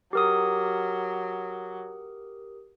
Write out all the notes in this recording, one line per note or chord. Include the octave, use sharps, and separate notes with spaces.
F#3 G4 A#4 D#6